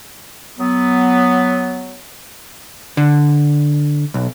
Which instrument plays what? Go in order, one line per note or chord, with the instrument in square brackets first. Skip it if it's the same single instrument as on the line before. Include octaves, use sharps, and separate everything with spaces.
[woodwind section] F#3 B3
[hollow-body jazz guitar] D3
B1